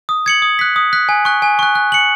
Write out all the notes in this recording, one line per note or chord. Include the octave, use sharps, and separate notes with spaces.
D#6
G#6 C#7 F#7
D#6
F#6 B6
D#6
F#6 B6
G#5
C#6 F#6
G#5
C#6 F#6
F#6
C#7 F#7